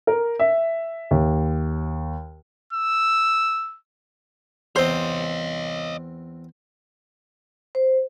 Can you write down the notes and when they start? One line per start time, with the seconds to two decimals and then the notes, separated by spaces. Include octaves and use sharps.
0.07 A#4
0.39 E5
1.11 D#2
2.73 E6
4.76 E2 C4 C5 C#5 D#5
7.75 C5